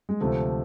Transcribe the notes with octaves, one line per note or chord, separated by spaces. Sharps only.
G#3
D2 C3 F3 A3